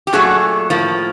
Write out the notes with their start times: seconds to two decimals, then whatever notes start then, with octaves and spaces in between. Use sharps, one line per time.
0.07 G4
0.13 A#2 F#3 A3 F#4 G#4
0.70 A2 F3 A#3